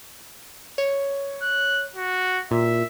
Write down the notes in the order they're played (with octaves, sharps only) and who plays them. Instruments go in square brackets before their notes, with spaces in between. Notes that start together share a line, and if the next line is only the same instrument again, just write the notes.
[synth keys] C#5
[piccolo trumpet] F#6
F#4
[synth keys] A#2 [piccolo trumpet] E5